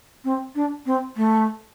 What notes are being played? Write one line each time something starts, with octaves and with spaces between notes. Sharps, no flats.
C4
D4
C4
A3